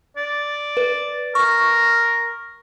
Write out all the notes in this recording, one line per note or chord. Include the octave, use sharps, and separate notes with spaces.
D5
B4
A#4 C#6